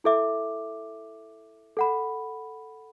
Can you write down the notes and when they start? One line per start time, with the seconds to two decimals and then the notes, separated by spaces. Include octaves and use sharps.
0.04 E4 A4 E5 D6
1.77 A4 F#5 B5